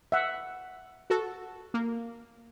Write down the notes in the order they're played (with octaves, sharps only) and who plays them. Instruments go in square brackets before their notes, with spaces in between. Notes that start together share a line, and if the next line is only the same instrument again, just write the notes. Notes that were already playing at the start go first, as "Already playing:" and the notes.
[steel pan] E5 F#5
[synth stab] F#4 A4
A#3